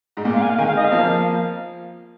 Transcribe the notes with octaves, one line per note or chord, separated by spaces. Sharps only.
G#2
A#2
F5
G#5
F5
D#3 G#3 G#5
F5
D#5
F5
F3 A#3